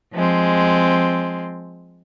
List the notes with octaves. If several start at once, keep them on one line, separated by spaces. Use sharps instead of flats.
F3 G#3 C4